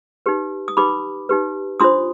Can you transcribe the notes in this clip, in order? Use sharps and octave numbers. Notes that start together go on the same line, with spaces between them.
D#4 G4 B4
D#6
D#4 G4 B4 B5 D6
D#4 G4 B4
D4 F4 C5 C6 D#6